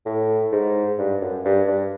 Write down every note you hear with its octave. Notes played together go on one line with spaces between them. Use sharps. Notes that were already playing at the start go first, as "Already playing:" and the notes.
A2
G#2
G2
F#2
G2
G2